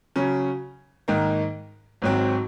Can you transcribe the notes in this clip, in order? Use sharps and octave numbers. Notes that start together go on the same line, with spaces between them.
C#3 F#3 C#4
G#2 D#3 A#3 D#4
G#1 G#2 F#3 C4